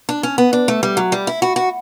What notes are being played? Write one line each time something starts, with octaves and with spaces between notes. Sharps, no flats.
D4
C#4
B3
D4
A3
G3
F#3
G3
E4
F#4
F#4